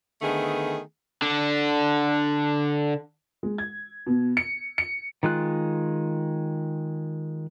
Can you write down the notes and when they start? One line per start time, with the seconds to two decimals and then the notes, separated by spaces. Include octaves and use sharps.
0.22 D3 D#3 A3 B3 G#4
1.22 D3 D4
3.43 G#3
3.58 G#6
4.07 B2
4.37 C#7
4.78 C#7
5.23 D#3 G#3 F4 F#6